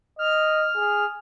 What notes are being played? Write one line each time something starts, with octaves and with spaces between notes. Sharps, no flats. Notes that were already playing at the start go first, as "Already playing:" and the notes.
D#5 F6
G#4